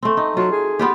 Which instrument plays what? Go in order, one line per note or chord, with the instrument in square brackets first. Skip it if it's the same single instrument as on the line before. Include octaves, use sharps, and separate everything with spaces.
[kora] A3 C4
D#4
[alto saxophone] F#3 [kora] F4
[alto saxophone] G#4
[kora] B3 F4 G4